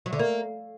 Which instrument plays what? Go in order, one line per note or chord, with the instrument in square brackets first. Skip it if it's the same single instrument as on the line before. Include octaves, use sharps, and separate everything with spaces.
[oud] F#3
D3
A#3